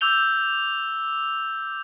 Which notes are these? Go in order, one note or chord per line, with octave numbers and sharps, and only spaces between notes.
D6 E6 G6 F7 G7